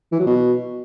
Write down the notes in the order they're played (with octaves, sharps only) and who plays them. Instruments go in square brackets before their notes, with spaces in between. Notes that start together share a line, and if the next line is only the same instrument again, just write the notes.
[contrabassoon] E3
F#3
B2